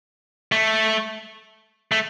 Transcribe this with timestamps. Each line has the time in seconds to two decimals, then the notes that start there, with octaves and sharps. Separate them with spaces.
0.52 A3
1.92 A3